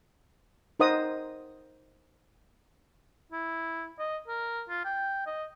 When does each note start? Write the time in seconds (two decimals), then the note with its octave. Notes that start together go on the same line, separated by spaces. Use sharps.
0.80 D#4 A#4 C5 D#5 F#5 D#6
3.32 E4
3.99 D#5
4.28 A#4
4.69 F4
4.85 G5
5.26 D#5